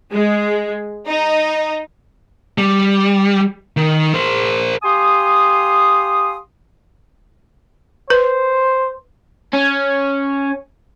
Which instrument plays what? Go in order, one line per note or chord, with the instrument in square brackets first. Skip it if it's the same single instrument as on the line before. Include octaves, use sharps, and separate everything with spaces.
[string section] G#3
D#4
[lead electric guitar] G3
D#3
A#4 C5
[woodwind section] G4 F5 G#5 C6 D#6
[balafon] B4 [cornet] C5
[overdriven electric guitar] C#4